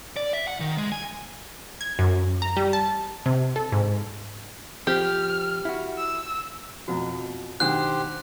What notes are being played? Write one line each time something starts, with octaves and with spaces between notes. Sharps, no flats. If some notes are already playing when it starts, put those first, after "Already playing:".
D5
E5
F#5
D#3
G#3
G#5
G#6
F#2
A#5
G3
A5
C3
A4
G#2
F3 C4 G4 F6
E4 F#4
E6
F2 B2 F#4 A#5
B2 D#3 D4 G4 C5 F#5 E6 F#6